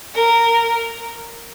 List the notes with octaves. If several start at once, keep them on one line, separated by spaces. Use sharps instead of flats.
A#4